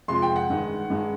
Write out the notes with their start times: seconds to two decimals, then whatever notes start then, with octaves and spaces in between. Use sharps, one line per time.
0.08 F2 C3 F3 G#3 C6
0.22 G5
0.36 F#5
0.50 G2 D#3 G#3
0.90 G2 D#3 G#3